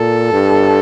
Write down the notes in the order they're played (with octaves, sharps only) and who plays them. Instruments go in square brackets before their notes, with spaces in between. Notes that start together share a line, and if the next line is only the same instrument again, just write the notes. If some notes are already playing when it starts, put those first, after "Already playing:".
Already playing: [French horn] A#2 [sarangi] A4
[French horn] G2